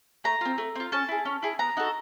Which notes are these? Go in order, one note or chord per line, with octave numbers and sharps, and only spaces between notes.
A3 A#5
C4 F4
A3
C4 F4
C#4 A5
E4 G#4
C#4
E4 G#4
B3 A#5
D#4 F#4 A4